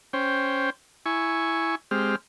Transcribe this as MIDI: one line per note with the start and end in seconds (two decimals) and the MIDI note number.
0.13 0.70 61
0.13 0.70 72
0.13 0.70 79
1.06 1.75 64
1.06 1.75 80
1.06 1.75 85
1.91 2.16 56
1.91 2.16 60
1.91 2.16 67
1.91 2.16 89